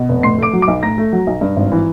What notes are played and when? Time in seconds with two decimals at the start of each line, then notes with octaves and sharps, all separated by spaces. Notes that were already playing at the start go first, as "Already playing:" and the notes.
Already playing: B2
0.09 F1
0.23 A2 C6 C7
0.38 A3 D6 D7
0.53 F#3
0.62 D6 D7
0.68 B1
0.82 A2 A#5 A#6
0.98 A3
1.13 F#3
1.27 B1
1.41 G2
1.56 G#1
1.72 E3